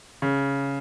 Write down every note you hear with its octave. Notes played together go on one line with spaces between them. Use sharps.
C#3